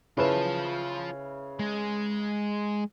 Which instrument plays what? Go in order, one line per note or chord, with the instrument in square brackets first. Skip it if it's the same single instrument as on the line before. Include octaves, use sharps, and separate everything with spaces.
[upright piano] C#3 E4 B4 [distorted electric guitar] F4 A5
[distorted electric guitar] G#3